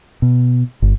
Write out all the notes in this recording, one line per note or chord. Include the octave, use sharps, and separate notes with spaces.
B2
G1